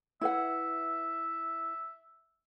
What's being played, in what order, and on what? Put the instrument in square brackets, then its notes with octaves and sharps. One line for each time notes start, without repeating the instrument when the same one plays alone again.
[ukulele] E4 B4 F#5 [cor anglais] E5